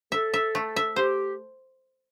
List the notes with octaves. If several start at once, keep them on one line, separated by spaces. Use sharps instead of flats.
A4 E5
E5
A3
E5
G4 C5